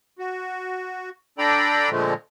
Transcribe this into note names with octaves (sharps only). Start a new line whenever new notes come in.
F#4
D4 A4 D5 G5 A#5 B5
A#2 D3 F3 G#3 A3